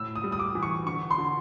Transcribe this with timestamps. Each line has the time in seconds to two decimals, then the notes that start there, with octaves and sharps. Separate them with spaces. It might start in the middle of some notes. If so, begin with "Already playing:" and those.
Already playing: A2 E6
0.16 D#6
0.24 G3
0.32 D#6
0.39 D6
0.55 E3
0.63 C#6
0.86 D3 C#6
1.11 C6
1.18 D3